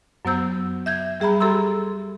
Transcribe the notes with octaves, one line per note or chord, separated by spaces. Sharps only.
F#2 F#3 B3 C5 E6 G6
E5 G6 G#6
G3 G#4 E5 A#5 B5
G4 A4 A#5 C6 E6